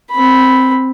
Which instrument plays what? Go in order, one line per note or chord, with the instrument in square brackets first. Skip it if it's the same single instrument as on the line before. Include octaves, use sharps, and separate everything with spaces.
[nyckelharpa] C4 B5